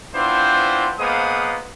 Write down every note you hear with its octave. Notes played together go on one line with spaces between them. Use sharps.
B3 C4 D4 E4 F4 C5
G#3 A#3 B3 C5 F5 D#6